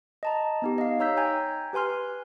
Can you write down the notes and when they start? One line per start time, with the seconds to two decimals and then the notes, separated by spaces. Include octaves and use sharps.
0.23 D#5 A5 A#5
0.62 B3 D#4 G4
0.78 D#5 F5
0.99 D#4 C#5 A#5 E6 G6 B6
1.17 G5 G#5 A#5 G6 G#6
1.73 G4 B4 G#5 C6 F6